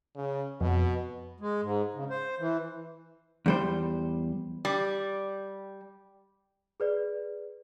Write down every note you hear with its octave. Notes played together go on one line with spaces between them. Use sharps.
C#3
F2 B2
G#3
G#2
C#3
C5
E3
E2 G3 C5
G3
G#4 B4 D5